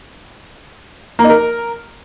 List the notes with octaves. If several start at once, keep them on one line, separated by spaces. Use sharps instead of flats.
A#3
D#4
A#4